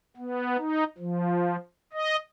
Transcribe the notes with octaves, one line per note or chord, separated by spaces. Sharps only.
B3
D#4
F3
D#5